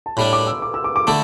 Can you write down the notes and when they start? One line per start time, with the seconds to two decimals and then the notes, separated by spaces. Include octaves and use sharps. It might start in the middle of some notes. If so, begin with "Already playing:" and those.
0.06 A5
0.17 A2 G3 D4 B5
0.33 D6
0.47 E6
0.62 D6
0.74 E6
0.84 D6
0.96 D6
1.07 D3 A3 E4 A5